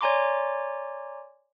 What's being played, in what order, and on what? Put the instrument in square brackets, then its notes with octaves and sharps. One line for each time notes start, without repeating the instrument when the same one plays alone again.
[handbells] C#5 D5 G#5 A#5 C6 D6